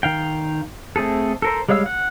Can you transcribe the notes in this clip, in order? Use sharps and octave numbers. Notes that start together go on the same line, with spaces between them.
D#3 F5 G5
A3 C4 G#4 A4
A4 A#4 C5
G3 G#3 C#5 F5 E6
F#5